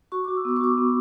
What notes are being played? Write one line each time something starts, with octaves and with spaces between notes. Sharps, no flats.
F#4 C#6
D6
F#4
E6
B3 D6
C#6
F#4 D6
B3